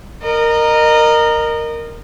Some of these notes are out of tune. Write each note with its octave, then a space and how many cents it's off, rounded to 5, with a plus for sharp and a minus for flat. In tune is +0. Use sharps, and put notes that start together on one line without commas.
A#4 +0 D#5 -25